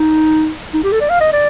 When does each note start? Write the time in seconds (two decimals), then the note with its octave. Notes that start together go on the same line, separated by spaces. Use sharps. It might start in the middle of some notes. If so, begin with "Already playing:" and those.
Already playing: D#4
0.74 D#4
0.84 G4
0.92 A4
1.01 D5
1.10 F5
1.21 D#5
1.32 D5